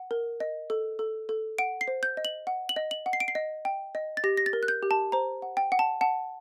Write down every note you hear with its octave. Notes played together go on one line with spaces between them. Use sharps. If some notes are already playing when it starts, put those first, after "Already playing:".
Already playing: F#5
A#4
D#5
A4
A4
A4
F#5 D7
C7
C5
G6
D#5
F#7
F#5
F#7
D#5
F#7
F#5
C7
D7
C7
D#5
G5
D#5
A6
G4 A#6
A#6
A6
A#4
F#6
G6
G4
A5
C5 A#5
F#5
G5
F#5
A5
F#5 A5